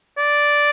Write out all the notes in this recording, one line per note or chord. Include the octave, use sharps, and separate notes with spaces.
D5